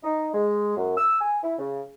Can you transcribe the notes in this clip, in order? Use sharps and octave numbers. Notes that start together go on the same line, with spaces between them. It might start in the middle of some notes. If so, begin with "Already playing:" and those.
D#4
G#3
F#2
E6
G#5
E4
C#3